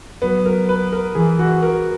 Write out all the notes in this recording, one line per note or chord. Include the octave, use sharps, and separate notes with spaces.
F#3 B3
A#4
B4
A#4
E3 G#4
F#4
A#4